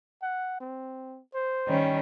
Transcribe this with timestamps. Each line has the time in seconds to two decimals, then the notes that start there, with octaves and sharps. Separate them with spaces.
0.22 F#5
0.60 C4
1.34 C5
1.68 D#3 G3 C#4